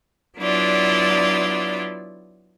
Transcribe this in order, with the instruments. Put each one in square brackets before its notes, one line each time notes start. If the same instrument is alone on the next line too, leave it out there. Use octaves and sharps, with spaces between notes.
[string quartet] F#3 B3 D4 E4 F4 D5